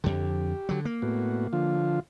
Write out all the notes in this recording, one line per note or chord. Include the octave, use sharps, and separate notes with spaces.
F2 D3 G4
D3 F#3
A#3
A2 B3 F#4
D3 F3 F4